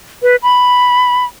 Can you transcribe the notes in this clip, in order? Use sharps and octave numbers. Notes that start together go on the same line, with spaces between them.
B4
B5